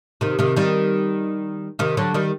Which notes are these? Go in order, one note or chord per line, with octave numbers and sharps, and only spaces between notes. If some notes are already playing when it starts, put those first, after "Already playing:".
C3 D#3
C3 D#3
D#3 G3
C3 D#3
D3 F#3
D#3 G3